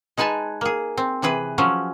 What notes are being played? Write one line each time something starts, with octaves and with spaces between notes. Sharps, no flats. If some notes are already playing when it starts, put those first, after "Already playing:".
G#3 D#4 B4 G#5 A5
A#3 G#4
C4
C3 E3 G#4 B4
F3 F#3 C#4